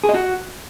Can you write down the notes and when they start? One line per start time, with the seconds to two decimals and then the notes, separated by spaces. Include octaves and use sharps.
0.04 G#4
0.09 D#5
0.14 F#4